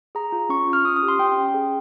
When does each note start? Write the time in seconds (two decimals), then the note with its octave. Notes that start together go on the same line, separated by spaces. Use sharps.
0.15 G#4 A#5
0.32 F4
0.49 C#4 C#6
0.68 F4
0.73 F6
0.85 C#4 D#6
0.96 D#6
1.03 G4
1.08 C6
1.19 C#4 G5
1.36 C#4
1.54 G#4